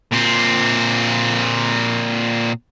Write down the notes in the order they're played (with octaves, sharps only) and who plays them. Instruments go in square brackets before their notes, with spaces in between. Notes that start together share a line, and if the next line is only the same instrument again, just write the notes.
[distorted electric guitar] A#2 C4